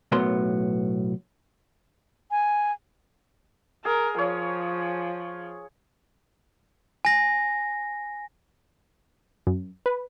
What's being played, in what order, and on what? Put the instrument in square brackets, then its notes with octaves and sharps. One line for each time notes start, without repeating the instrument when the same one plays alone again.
[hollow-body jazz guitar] B1 A2 F#3 B3 A#4 C6
[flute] G#5
[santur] G#4 [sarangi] A#4
[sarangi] F3 [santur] C#5
[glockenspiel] G#5 A#6
[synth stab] F#2
B4